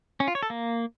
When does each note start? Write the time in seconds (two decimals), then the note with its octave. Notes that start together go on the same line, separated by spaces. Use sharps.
0.20 C#4
0.28 F4
0.35 C#5
0.43 A4
0.50 A#3